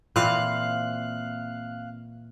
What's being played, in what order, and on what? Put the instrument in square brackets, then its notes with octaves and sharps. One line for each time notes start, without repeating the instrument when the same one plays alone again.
[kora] A#2 E3 C4 [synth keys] F5 F#6